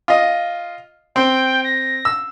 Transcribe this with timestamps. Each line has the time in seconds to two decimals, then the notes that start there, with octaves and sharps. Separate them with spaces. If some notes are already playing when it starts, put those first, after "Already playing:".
0.08 F4 D#5
1.16 C4 G5
1.64 A#6
2.05 E6